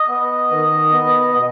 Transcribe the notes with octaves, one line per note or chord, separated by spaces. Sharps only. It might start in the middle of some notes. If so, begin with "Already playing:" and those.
Already playing: D#5
B3
D#3
B3
B2